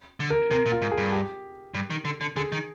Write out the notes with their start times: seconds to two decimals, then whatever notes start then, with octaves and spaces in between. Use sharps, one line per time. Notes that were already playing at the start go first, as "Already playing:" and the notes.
0.20 D3
0.30 A#4
0.51 C3 A#4
0.66 A#2
0.72 F4
0.82 G#2
0.91 G#4
0.97 G2
1.12 G4
1.74 G2
1.90 D#3
2.05 D3
2.21 D3
2.36 D3 G#4
2.52 D#3